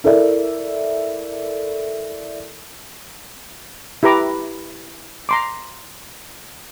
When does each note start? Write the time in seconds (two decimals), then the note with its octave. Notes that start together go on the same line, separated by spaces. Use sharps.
0.04 E4 A4 A#4 D5 E5
4.03 E4 G4 B4 A#5 D6
5.29 A#5 C6 D6